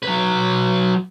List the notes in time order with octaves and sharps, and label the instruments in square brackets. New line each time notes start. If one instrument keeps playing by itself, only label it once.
[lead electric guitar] F#3 B4